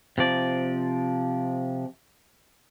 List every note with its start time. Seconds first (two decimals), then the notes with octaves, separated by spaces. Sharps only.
0.18 C3 F3 D5